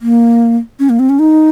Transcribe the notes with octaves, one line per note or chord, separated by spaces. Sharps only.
A#3
C#4
A#3
C4
C#4
D#4